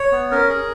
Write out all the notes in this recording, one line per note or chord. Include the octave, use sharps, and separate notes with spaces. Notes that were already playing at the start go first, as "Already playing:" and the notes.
Already playing: C#5
B3
C#4 A#4
G#4